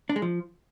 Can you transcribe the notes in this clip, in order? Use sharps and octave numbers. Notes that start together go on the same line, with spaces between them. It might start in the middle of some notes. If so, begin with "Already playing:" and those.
D4
G#3
F3